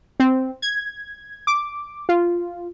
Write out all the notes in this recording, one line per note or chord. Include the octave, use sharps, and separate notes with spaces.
C4
G#6
D6
F4